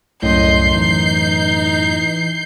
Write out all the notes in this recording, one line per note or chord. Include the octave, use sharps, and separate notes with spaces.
C2 F#2 A2 D#5 C6 G6 C7
E3 D#4